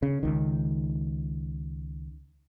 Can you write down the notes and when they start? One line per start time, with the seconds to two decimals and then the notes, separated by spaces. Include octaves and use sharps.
0.02 C#3
0.23 C#2 D#3